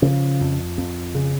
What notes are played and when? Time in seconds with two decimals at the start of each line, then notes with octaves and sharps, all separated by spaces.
0.02 C#3 F3
0.41 F2
0.78 F2
1.15 C#3